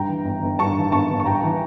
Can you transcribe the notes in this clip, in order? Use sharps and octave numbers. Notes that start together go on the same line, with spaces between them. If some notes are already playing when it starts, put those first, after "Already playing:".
Already playing: G2 G5 A#5
E3
G1
G1
G2 A5 C#6
E3
G1 A5 C#6
G1
C#6
G2 G5 A#5
E3